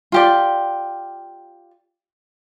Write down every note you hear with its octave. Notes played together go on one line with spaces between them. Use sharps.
F4 G4 D5